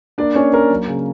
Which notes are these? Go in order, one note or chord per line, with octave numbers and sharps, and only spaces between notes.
A#3 D4 D5
A#3 C#4 C#5
A#3 A#4
F#3
C#3